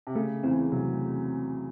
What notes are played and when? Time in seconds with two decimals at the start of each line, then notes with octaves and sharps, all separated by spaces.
0.07 C3
0.15 C#3 A3
0.43 E2 E3 C4
0.72 C3 F#3